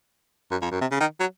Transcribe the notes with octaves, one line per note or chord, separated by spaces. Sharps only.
F#2
F2
F#2
C3
C#3
D#3
F#3